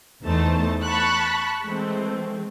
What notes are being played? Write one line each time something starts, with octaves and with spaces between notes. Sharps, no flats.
E2 E3 A3 D#4 C5 A5
A5 B5 C#6 F#6
E3 G#3 A3 C4